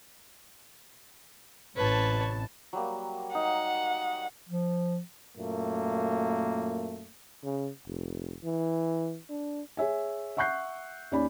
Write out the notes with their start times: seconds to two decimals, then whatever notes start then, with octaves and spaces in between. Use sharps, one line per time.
1.76 A1 C3 B4 C#5 A5
2.73 F#3 G3 A#3
3.35 D#4 F#5
4.49 F3
5.37 F#2 A#2 A3 A#3
7.44 C#3
7.87 F1
8.44 E3
9.29 D4
9.77 G#4 C#5 E5 G#5
10.37 E5 F#5 C#6 F#6 G6 C7
11.11 D#2 C#4 D5 B5